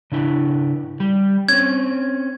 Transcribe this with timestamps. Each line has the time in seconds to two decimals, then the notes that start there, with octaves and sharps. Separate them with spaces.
0.12 C#3 D4 E4
1.00 G3
1.49 C4 C#4 G#6